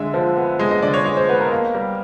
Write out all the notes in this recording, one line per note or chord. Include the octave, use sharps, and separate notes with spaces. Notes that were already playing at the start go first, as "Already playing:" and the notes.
Already playing: D3 G#3 E5
F3
B3
G#3 D#5
D#5
D3 D5
C#5
G#3
C5
B3 B4
A#4
A#3
G3